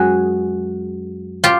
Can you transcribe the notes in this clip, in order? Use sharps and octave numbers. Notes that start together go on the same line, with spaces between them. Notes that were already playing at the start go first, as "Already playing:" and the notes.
Already playing: F#2 G#3 F#4 G#4
F4 G4